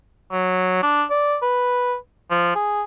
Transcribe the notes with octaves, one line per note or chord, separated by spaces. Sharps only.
F#3
D4
D5
B4
F3
G#4